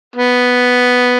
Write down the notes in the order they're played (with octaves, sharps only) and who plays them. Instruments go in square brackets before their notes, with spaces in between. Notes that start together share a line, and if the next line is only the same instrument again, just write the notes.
[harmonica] B3